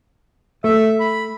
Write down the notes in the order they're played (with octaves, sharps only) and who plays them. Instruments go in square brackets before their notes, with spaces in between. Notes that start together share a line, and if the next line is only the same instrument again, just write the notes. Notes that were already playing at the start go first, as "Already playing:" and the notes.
[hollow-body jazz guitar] A3 [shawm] E5
[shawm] B5